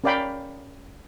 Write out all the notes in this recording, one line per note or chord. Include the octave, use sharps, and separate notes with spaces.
C#4 A#4 D5 F5 G5 B5